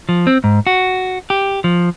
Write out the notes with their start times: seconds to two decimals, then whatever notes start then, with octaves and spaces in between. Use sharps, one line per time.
0.09 F3
0.27 C4
0.44 G#2
0.67 F#4
1.30 G4
1.64 F3